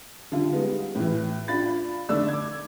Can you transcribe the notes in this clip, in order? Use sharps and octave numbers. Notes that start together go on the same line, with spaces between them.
D3 G3 F4 G4
G3 G#3 B3 D#4
A2 E3
D4 F4 B5 A6
D3 A3 D#4 D5 E6
D6 G#6